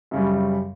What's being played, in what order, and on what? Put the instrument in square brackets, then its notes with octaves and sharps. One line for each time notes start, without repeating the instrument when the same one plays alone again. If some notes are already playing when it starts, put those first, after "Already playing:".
[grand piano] F#2 C#3 G3